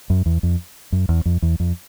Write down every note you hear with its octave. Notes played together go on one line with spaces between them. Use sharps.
F#2
E2
F2
F#2
E2
F2
E2
F2